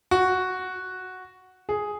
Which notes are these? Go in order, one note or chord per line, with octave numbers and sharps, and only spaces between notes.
F#4
G#4